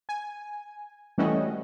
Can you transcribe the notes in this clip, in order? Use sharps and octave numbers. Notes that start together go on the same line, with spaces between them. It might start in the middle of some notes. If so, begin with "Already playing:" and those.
G#5
E3 G3 A3 C#4 F#4 D#5